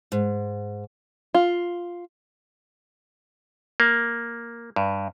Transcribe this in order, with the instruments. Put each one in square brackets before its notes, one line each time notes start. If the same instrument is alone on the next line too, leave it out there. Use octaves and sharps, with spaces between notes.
[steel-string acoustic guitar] G#2
[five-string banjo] F4
[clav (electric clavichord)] A#3
G2